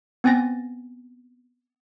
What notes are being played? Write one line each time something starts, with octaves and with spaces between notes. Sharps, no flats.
B3 C4 G#5 A6 A#6